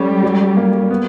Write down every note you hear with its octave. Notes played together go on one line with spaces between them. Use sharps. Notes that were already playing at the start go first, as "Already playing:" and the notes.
Already playing: G3 A3 C#4
F#3
A#3
B3